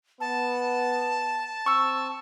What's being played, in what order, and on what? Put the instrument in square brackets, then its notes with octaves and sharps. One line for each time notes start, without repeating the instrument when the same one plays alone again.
[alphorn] B3 [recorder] A5
[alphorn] C4 [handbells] C#6 E6